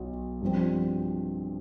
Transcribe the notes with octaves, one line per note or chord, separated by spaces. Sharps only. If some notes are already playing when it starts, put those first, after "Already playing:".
Already playing: B1
G2 F3 C4